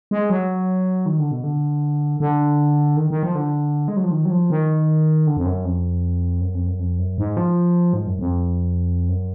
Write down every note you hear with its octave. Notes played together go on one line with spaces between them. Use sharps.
G#3
F#3
D#3
D3
B2
D3
D3
D#3
D#3
F3
D3
G#3
F#3
F3
D#3
F#3
F3
D#3
D3
F2
F#2
F2
F#2
F2
F#2
F2
F#2
G#2
F3
G#2
F#2
F2
F#2